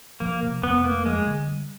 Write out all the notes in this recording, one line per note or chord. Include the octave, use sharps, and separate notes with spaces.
F3 A#3
C3
F2 B3
A3 A#3
F3 G#3
D3
G3